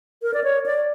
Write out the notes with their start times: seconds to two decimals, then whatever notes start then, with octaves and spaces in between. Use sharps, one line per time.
0.23 A#4
0.34 D5
0.44 C#5
0.66 D5